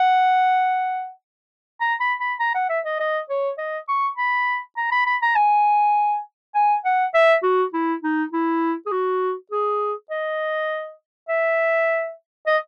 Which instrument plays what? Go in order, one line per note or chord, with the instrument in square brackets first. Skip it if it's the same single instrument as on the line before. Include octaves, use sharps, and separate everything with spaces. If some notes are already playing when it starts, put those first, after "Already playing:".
Already playing: [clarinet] F#5
A#5
B5
B5
A#5
F#5
E5
D#5
D#5
C#5
D#5
C#6
B5
A#5
B5
B5
A#5
G#5
G#5
F#5
E5
F#4
E4
D#4
E4
G#4
F#4
G#4
D#5
E5
D#5